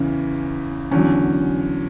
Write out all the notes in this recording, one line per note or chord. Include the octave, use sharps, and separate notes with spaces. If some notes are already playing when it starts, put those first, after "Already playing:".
Already playing: E2 C#3 E3 C#4
E2 D3 F#3 C#4